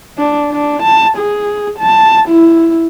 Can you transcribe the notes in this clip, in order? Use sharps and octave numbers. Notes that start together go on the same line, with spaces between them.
D4
D4
A5
G#4
A5
E4